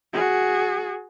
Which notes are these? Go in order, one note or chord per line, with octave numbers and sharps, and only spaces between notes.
F#4 G#4